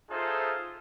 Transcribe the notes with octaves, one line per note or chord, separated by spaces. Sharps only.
D#4 F4 G#4 A4 C5 E5